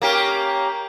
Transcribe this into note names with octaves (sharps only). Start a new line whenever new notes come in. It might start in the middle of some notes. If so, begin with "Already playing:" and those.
A#3 C#4 G4